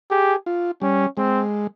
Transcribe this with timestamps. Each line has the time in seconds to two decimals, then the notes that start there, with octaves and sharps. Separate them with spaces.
0.11 G4 G#4
0.46 F4
0.82 G3 C#4
1.17 G#3 C4